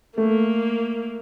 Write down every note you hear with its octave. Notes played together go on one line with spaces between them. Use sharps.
A3 A#3